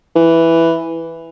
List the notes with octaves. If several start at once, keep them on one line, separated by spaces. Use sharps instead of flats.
E3